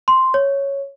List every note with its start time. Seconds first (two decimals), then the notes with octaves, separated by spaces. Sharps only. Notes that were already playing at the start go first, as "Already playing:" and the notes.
0.08 C6
0.34 C#5